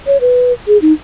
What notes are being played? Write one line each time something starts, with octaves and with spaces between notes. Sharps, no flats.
C#5
B4
G#4
D#4